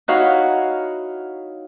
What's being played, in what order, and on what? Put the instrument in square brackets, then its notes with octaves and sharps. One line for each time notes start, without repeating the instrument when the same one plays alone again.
[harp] D#4 E4 F#4 C#5 F5